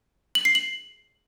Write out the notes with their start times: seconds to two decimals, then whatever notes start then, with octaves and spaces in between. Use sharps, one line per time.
0.35 F#7
0.45 C7
0.55 F#7